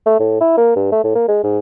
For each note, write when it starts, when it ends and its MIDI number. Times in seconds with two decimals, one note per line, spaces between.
0.06 0.18 57
0.19 0.37 45
0.41 0.54 64
0.57 0.74 58
0.76 0.88 43
0.92 0.99 57
1.04 1.11 45
1.15 1.26 58
1.28 1.40 56
1.44 1.59 44